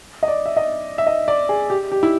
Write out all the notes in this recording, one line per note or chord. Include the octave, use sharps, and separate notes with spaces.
D#5
D5
E5
D#5
E5
D#5
D5
G#4
G4
G4
E4